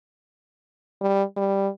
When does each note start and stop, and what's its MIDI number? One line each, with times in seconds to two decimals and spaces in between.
1.01 1.23 55
1.37 1.68 55